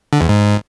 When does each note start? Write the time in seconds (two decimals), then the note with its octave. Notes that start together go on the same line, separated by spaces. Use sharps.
0.13 D3
0.21 E2
0.29 G#2